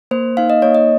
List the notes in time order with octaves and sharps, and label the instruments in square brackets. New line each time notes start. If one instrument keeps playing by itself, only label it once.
[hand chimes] A#3 C5
D#4 F5
D#5
A#3 C#5
D#5